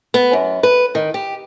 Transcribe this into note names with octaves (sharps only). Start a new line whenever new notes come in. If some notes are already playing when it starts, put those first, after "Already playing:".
B3
F#2
B4
D#3
G4